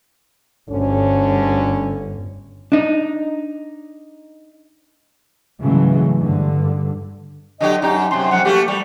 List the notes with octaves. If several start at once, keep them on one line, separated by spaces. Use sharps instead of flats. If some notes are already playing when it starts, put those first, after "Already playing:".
G1 D2 D3 C#4
D4 D#4
G#2 C#3 E3 F#3 G#3 A3
G2 D3
D3 F#3 G4 D#5
F#2 D#4 G4
F#2 C3 C6
F#2 F3 G#3 F#5
A3 A#3 F#4 G4
G3 C#6